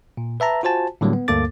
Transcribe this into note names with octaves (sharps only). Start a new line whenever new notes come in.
A#2
B4 E5 A5 A#5
F4 F#4 C5 G#5 A5
A2 D3 F#3 G3 A#3 B3
B3
D2 G2 A#3 A4 D6 A6